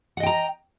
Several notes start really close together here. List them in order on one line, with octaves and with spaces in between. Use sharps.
F#5 D#5 G5 A#5